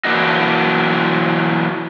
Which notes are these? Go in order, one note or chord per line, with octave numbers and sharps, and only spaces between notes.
E3 F#3 A#3 D4 D#4 F#4